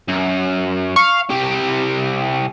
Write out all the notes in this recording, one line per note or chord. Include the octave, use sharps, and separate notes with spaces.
F#2
F5 C#6
C2 G4